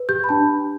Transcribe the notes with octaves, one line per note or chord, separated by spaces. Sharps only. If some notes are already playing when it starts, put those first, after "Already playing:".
Already playing: B4
G4 G6
B5
D4 A5